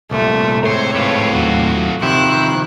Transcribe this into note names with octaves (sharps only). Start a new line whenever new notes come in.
C2 A#2 A3
A2 G#3 C4 C5 C#5
G#2 A3 F4 B4 D6
D#2 F#3 F#4
C3 D#3 F3 C4 E4 G4 F#6